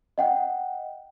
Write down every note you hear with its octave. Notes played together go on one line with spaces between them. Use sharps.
D#5 F#5 G5